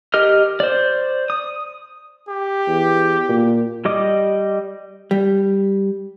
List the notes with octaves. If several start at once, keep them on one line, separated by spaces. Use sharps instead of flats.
G4 A#4 D#5 F6
C5 D5
D#6
G4
E2
A#2
G3 G4 D#5 D6 D#6
G3